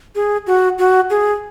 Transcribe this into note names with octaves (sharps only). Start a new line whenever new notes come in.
G#4
F#4
F#4
G#4